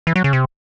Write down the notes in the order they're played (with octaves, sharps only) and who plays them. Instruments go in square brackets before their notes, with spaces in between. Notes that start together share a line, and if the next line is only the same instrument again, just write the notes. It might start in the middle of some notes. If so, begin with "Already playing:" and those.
[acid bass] E3
F#3
C#3
C3